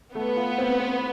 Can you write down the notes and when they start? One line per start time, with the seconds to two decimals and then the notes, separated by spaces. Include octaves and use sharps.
0.15 A3 B3
0.36 F4
0.58 C4
0.80 C4